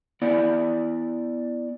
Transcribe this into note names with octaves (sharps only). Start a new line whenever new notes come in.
B3 E4 D5 F#5